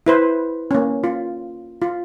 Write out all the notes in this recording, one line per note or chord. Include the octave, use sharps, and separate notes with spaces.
E4 B4 C5
A#3 C#4
F4
F4